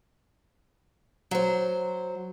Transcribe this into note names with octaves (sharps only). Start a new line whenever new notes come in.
F#3 C5